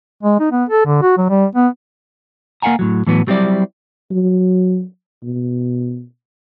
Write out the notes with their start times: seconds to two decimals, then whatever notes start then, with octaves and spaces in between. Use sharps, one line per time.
0.23 G#3
0.40 D#4
0.52 B3
0.69 A4
0.86 D3
1.02 F#4
1.17 F#3
1.29 G3
1.55 B3
2.62 A#3 A#4 F5 F#5 G#5 A#5
2.79 A2 F#3
3.07 A2 E3 F#3 B3
3.27 F#3 G3 C4 E4 D5
4.11 F#3
5.23 B2